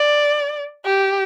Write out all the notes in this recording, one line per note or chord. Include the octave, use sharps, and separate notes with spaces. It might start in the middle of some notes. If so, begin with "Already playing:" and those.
Already playing: D5
G4